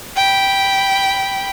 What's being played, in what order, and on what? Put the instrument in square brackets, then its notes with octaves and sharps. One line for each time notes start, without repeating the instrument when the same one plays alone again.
[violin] G5 B5